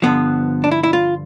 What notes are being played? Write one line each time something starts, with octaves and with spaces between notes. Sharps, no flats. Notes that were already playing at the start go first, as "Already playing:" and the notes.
G2 D3 F3 B3
D4
E4
E4
F4